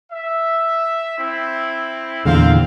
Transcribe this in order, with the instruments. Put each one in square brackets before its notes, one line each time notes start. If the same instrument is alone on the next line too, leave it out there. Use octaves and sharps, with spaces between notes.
[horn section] E5
C4 E4
[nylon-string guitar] E2 A#2 D3 [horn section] C4 F5